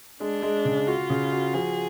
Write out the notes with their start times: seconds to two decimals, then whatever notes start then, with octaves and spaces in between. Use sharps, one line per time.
0.20 G#3 D4
0.42 G#3
0.65 C#3
0.87 F4 F#4
1.10 C#3
1.32 F#4
1.54 F3 G#4